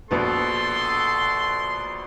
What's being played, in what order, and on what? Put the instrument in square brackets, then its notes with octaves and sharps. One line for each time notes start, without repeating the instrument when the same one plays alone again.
[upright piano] A#1 B2 B4 [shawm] A4 [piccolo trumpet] C6